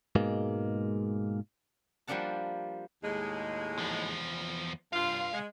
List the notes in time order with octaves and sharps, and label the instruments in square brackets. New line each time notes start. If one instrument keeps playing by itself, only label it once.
[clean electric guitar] G#2 B2 G#3 A#3
[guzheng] F3 G3 A#3 D4 F#5 A5
[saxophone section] D#2 A2 G#3
[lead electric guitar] E2 F3
[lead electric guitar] C2 F5 [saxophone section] G2 F4
[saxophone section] G#3